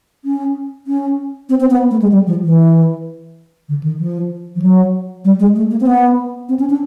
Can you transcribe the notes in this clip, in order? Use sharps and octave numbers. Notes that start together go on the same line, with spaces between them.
C#4
C#4
C4
C4
B3
A3
G#3
G3
F3
E3
D3
D#3
F3
F3
F#3
G3
G#3
A3
A#3
C4
B3
C4
C#4
D4